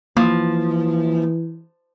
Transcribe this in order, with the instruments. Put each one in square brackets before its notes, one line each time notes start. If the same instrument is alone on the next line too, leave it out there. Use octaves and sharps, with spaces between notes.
[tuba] E3 [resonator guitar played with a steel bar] F3 [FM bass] A#3